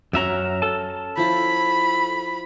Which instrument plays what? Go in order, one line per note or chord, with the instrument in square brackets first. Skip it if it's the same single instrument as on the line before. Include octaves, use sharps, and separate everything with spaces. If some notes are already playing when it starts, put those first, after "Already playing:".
[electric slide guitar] F#2 E5 A#5 [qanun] C#4 F#4 A#4
[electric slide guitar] A4 A5
[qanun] F3 E4 [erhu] B5